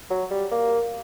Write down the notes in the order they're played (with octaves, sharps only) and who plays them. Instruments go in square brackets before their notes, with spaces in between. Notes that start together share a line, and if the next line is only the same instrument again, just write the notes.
[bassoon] F#3
G3
A#3